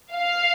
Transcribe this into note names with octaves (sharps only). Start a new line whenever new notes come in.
F5